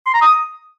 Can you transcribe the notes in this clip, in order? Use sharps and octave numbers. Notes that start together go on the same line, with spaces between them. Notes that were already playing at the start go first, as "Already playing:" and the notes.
C6
A#5
D#6